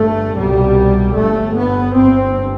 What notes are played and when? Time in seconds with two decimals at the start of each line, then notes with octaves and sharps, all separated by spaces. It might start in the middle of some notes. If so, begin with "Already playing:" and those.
Already playing: G1 G2 A3
0.36 C2 B2 G3
1.16 G1 G2 A3
1.56 B3
1.96 G1 G2 C4